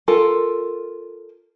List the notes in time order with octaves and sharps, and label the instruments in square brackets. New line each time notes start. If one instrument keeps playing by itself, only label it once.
[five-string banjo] F4 A4 A#4